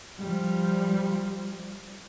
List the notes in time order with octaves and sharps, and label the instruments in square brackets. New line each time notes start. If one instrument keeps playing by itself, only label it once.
[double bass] F3 G3